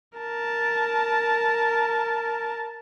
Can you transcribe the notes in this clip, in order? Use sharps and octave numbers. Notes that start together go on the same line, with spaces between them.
A#4 A5